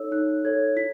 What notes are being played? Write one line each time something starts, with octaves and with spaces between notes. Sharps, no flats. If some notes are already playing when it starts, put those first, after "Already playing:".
Already playing: D#4 A4 C#5 E6
D#4 F#6
A4 C#5 G#6
E4 B6